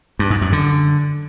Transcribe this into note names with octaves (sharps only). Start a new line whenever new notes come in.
G2
G#2
F#2
D3